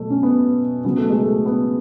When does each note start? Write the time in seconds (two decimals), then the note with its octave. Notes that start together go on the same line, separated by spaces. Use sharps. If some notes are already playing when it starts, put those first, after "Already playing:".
Already playing: B2 F#3 A3
0.10 C#4
0.23 B3
0.85 C#3 F#3 B3
0.97 A3
1.10 G#3
1.22 A3
1.46 B3